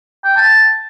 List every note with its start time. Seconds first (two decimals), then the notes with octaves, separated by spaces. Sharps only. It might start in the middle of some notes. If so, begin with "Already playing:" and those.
0.24 G5
0.37 A5